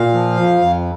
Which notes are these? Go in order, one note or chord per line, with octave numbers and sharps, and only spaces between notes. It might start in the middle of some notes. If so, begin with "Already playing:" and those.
Already playing: A#2 F5
F3
F2
F2